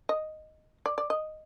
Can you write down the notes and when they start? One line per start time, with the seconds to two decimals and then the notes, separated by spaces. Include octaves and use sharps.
0.09 D#5
0.86 D5
0.98 D5
1.10 D#5